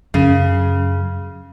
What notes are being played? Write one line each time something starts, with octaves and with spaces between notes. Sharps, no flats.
F#2 C#3